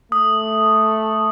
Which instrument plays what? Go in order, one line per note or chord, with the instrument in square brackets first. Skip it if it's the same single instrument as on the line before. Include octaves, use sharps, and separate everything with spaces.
[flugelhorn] A3 [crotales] D#6